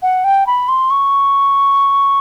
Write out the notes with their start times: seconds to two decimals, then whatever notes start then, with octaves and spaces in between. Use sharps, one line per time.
0.02 F#5
0.24 G5
0.47 B5
0.68 C6
0.91 C#6